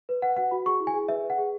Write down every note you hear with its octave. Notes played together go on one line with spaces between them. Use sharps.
B4
B4 F#5
F#4 F#5
F#4 B5
G#4 C#6
E4
G#5
G#4
B4 E5
B4
F#5
G#4